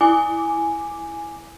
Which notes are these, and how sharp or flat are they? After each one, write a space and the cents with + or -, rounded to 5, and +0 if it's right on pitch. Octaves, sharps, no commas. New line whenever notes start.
E4 +5 G#5 +0 D6 +0